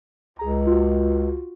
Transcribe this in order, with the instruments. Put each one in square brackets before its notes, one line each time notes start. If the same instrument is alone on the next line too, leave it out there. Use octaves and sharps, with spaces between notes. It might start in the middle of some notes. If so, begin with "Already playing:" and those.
[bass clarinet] C#2 [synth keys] G#4 A#5
[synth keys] F4 F#4